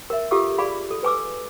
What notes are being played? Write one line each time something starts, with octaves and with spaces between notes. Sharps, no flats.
A#4 E5
F4 G4 A4 F5 D6 E6
G#4 D5 F5 B5
A4
B4 G#5 D6 E6